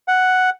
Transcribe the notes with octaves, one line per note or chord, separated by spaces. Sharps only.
F#5